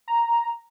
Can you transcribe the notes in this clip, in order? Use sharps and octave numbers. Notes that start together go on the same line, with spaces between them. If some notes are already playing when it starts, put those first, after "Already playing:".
A#5